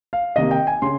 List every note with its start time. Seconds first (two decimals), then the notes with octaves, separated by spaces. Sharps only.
0.13 F5
0.36 C3 D#3 A#3 D#5
0.51 G5
0.67 G#5
0.82 C#3 C6